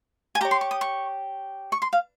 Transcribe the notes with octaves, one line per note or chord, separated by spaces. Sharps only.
G#5
G4 C#5 A#5
C6
C#6
D#6
C#6
C#6
C6
F5